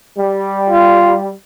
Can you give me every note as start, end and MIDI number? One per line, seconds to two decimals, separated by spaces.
0.18 1.32 55
0.70 1.16 65